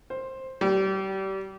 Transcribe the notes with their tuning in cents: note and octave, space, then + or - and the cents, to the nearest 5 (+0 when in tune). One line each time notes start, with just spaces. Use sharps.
C5 +10
G3 -30